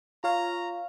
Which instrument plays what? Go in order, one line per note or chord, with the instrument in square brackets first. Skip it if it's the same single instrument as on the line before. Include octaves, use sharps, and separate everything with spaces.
[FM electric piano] F4 C#5 F5 [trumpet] A#5